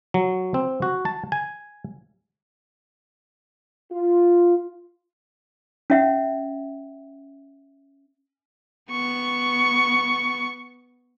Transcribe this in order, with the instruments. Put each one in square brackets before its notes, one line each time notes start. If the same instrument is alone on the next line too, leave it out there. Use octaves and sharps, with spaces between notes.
[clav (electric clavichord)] F#3
C4
F#4
A5
G#5
[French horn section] F4
[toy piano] C#4 E5 F#5
[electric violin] B3 C#6